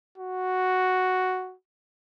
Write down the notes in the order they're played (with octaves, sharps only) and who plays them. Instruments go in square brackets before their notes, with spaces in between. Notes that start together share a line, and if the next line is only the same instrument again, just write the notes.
[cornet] F#4